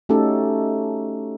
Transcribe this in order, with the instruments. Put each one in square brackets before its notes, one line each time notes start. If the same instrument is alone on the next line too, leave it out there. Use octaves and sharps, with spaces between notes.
[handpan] A3 C#4 D#4 F#4 G4 A4